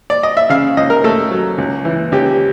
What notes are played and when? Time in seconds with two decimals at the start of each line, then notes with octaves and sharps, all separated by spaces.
0.10 D5
0.23 D#5
0.37 E5
0.49 C#3 F5
0.77 C#2 D#5
0.90 A#4
1.04 A3 A4
1.31 F#3
1.58 C#2
1.85 E3
2.12 C#2 G4